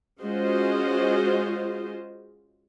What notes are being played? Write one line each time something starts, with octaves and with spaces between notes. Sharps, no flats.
G#3 C#4 F4 F#4 C5 D#5